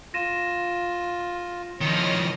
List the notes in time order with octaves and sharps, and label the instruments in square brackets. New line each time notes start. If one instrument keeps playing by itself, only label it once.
[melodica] F4 [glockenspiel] A#6 D#7 E7
[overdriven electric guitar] D#3 F3 [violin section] C#5 D#5 F6